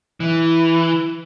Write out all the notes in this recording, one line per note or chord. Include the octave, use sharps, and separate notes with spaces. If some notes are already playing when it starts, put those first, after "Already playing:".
E3